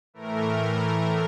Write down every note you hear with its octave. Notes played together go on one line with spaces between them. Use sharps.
A2 E3 A3 A#4